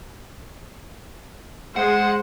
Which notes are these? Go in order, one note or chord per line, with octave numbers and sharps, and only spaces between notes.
G#3 C5 F#5